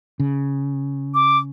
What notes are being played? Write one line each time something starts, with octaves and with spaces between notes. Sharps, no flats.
C#3
D6